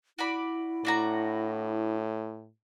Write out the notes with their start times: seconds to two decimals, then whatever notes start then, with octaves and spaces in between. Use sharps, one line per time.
0.18 E4 F#4 D5 B5
0.85 A2 D4 F#4 A#5